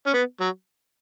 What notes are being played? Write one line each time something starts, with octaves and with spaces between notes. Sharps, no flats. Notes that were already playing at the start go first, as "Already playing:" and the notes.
C#4
B3
F#3